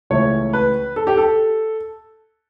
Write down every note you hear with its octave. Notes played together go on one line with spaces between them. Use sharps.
C#2 C#3 E3 A3 C#4 C#5
B4
A4
G4
A4